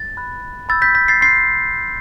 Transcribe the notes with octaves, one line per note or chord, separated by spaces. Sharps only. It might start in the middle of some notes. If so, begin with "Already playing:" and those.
Already playing: A6
B5 F#6
B5 E6 G6 A6
G6 B6
G6 B6
A6 C7
C6 F#6 A6 C7